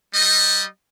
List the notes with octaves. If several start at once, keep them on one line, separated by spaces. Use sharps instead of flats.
G3 D#5